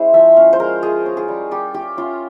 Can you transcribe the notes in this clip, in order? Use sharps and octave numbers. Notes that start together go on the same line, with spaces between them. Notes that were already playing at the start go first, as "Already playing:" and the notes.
Already playing: G#3 C#4 E4 C5
F3 E5
C#4 F5
C5
G#3 A#4
F4 G#4
C#4
G#4
G3
G3 G4
F4 G4
C#4 F4